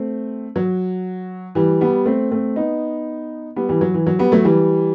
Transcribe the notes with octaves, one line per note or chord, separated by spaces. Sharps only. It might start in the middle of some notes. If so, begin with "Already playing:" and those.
Already playing: A3 C4
F#3
E3 G3
G3 B3
A3 C4
A3 C4
B3 D#4
G3 B3
E3 G3
F#3
E3
F#3
G3 B3
F#3 A3
E3 G3